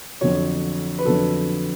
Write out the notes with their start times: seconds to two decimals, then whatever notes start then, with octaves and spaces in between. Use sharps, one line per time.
0.21 F2 D3 F#3 C#5
0.98 B4
1.05 F2 D3 F#3 A4